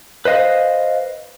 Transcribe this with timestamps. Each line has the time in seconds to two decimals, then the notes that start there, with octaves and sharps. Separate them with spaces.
0.25 B4 C5 D#5 F5